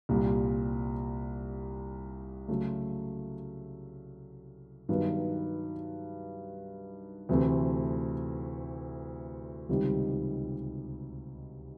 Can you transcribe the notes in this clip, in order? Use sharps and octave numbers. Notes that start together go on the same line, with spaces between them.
C2 A#2 G3
C#3 F#3 A3
G2 D#3 F#3 B3
D2 C3 E3 A3 C4
C#2 C3 D#3 G3